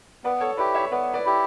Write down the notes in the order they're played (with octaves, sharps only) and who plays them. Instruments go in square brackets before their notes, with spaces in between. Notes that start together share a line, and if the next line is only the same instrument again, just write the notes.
[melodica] B3 [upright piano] B4 D5
[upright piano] A4 C#5
[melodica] E4 G4 [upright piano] B4 D5
[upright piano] C#5 E5
[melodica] B3 [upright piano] B4 D5
[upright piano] B4 D5
[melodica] E4 G4